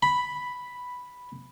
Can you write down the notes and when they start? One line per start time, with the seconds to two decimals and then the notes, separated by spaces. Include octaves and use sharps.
0.03 B5